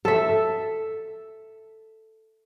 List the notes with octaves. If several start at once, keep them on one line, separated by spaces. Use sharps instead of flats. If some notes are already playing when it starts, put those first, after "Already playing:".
A4 E5